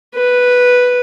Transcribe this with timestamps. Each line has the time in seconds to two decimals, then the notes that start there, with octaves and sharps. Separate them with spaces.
0.15 B4